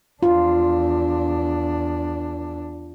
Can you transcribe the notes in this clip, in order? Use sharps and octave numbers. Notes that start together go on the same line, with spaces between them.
E2 D4 F4